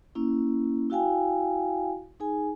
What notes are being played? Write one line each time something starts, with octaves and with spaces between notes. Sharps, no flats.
A#3 C#4 E4
E4 F#4 F5 G5 G#5
D#4 G#4 G#5